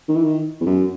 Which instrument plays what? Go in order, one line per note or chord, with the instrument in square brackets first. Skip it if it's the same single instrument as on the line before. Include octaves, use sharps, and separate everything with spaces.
[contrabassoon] D#3
E3
D#3
E2
F#2